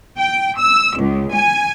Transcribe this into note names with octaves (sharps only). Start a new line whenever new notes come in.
G5
E6
C#2
G#5